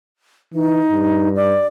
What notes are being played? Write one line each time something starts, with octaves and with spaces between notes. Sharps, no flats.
E3 D#4
G2
D5